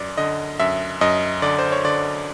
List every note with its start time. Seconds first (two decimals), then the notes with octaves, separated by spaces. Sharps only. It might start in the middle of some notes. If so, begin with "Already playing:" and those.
Already playing: F#2 D5
0.17 D3 D#5
0.60 F#2 E5
1.01 F#2 D#5
1.42 D3 D5
1.59 C5
1.72 C#5
1.84 D3 D5